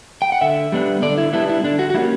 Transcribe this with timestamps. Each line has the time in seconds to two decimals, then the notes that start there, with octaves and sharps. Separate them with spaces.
0.22 G5
0.32 F#5
0.41 D3 E5
0.72 G3 B3 D4
1.02 D3 D5
1.18 E4
1.33 G3 B3 D4 E4
1.49 E4
1.63 D3 D4
1.79 F#4
1.90 F#4
1.94 G3 A#3 C#4 E4